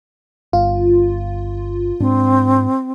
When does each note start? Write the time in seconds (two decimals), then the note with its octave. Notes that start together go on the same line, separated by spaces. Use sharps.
0.53 G1 F4
2.00 G#2 C4 D4